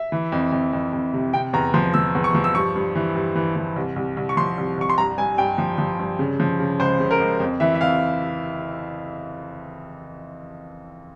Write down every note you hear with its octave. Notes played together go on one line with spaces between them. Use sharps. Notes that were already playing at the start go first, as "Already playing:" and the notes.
Already playing: E5
E3
F2
F2
F2
F2
C3
C3 G5
E2 A#5
F3 C6
F3 E6
E2
C#6
F3
E6
G2 C#6
G2
E3
G2
E3
E3
C2
C2
C2
C#6
F3 C6
C2
C2 C#6
C6
G2 A#5
G2 G#5
G2 G5
F3
F3
G2
C#3
F3
C#3
C#2 C5
C#3
A#4
C#2
F2
E3 E5
E5
F2 F5